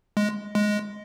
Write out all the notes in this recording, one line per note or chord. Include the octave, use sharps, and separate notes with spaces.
G#3
G#3